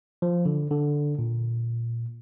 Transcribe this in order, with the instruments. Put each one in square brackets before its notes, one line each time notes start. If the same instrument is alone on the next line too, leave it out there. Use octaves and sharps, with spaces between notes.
[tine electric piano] F3
D3
D3
A#2